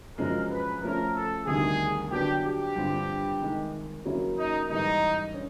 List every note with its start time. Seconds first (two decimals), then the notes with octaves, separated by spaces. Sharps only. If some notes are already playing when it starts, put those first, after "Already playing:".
0.18 F#2 C#3 F3 G#3 A#4
0.50 B4
0.83 F3 A3 C#4 A#4
1.15 A4
1.47 D2 C3 D#3 G3 G#4
2.11 D3 F#3 B3 D4 G4
2.44 G4
2.76 G2 D3 G3 C4 F4
3.41 C3 D#3 G#3
4.05 C#3 F#3 A#3 C#4 E4
4.38 D#4
4.69 G#2 E3 G3 D#4
5.34 C#4